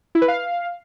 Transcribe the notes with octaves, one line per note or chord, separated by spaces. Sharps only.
E4
B4
F5